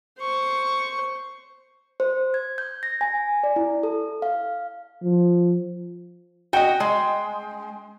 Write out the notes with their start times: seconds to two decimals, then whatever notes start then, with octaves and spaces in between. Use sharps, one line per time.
0.20 C5 C#6
2.00 C5
2.34 G#6
2.58 G6
2.83 A#6
3.01 G#5
3.43 D5
3.56 E4
3.83 A4
4.22 F5
5.02 F3
6.53 F#4 D#5 G5
6.80 G#3